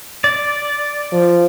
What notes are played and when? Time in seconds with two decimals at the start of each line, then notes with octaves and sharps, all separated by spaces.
0.24 D5
1.12 F3